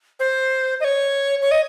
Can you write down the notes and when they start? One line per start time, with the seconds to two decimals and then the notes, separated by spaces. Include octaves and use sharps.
0.20 C5
0.80 D#5
0.84 C#5
1.42 C#5
1.51 D#5